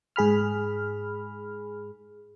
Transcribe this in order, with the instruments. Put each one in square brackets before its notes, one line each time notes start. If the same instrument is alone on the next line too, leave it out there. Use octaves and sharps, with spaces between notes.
[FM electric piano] G#2 G#4 B5 F6